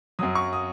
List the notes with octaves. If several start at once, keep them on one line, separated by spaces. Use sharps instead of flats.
F#2 F#3 D#6
C#6
D#6